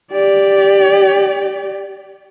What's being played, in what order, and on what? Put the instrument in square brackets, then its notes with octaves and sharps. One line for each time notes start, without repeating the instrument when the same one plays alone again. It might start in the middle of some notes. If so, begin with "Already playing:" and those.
[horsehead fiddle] G4 D5